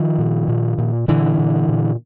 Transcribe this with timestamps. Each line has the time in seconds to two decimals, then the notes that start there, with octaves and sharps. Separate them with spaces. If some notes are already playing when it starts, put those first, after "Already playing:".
Already playing: D#3 F3
0.18 A#2
0.48 A#2
0.78 A#2
1.08 A#2 D3 E3
1.38 A#2
1.69 A#2